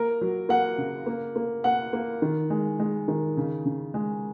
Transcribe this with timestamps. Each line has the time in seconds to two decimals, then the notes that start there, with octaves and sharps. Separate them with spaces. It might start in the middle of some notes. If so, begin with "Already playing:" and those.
Already playing: A#3 A#4
0.21 F#3
0.49 A#3 F#5
0.78 C#3
1.06 A#3
1.36 A#3
1.64 A#3 F#5
1.93 A#3
2.22 D#3
2.50 G#3
2.80 G#3
3.08 D#3
3.37 C#3
3.66 C#3
3.94 G#3